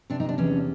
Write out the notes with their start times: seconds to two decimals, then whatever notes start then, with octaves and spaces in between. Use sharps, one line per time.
0.10 C3 D4
0.20 D#4
0.29 D4
0.38 E2 C#4